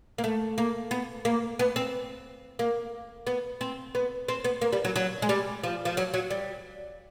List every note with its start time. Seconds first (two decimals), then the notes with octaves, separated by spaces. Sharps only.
0.18 A#3
0.24 A3
0.58 A#3
0.91 B3
1.25 A#3
1.59 B3
1.76 C4
2.59 A#3
3.27 B3
3.61 C4
3.95 B3
4.29 C4
4.44 B3
4.61 A#3
4.73 G3
4.85 F#3
4.96 F#3
5.22 G#3
5.29 G3
5.64 F3
5.85 F3
5.97 F#3
6.14 F#3
6.31 G3